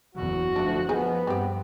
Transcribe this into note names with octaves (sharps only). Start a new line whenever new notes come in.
F#1 E2 F#4
D2 F3 D4 E4
F3 B3 D#4 G#4
G2 C4 G4